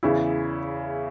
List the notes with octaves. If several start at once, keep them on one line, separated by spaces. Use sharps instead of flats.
E2 C#3 E3 E4